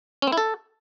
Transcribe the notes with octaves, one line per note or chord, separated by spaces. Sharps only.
C#4
C4
E4
A4